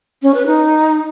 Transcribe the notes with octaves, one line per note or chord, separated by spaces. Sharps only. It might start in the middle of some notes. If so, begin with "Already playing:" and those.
C#4
B4
D#4